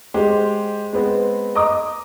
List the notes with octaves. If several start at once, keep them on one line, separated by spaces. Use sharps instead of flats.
G#3 G4 C5
G#3 B3 C4
D#5 A#5 D6 D#6